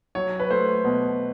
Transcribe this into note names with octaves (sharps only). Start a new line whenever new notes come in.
F#3 C#5
B4
A3 C5
B2